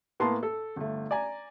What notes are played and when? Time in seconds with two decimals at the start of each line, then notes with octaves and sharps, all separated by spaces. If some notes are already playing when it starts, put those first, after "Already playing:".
0.20 A2 A#3 B3 A5 C6
0.43 A4
0.76 G1 A3
1.11 D5 G#5 A#5